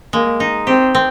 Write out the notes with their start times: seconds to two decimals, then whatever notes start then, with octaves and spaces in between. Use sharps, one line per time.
0.13 G#3 A#3
0.40 D#4
0.67 C4 G4
0.95 C4